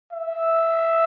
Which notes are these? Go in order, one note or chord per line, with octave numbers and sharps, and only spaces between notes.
E5